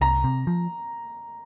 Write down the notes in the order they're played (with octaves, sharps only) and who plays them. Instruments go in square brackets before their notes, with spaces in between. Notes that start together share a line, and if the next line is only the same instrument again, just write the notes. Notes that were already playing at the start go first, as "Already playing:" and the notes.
[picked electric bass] C2 [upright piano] A#5
[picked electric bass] C3
F3